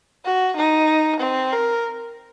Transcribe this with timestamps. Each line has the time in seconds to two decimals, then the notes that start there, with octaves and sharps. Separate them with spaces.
0.25 F#4
0.56 D#4
1.20 C4
1.52 A#4